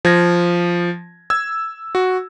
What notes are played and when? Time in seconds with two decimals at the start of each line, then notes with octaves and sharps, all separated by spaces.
0.05 F3 G#6 A#6
1.30 E6 G#6
1.95 F#4